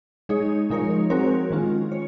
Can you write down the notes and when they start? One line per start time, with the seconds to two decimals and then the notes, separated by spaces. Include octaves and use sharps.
0.29 G#3 D#4 G#4 C#5
0.70 F3 G#3 D#4 A#4 C#5
1.10 G#3 C4 F#4 A#4 C#5
1.50 D#3 G#3 C#4 F4
1.92 C#5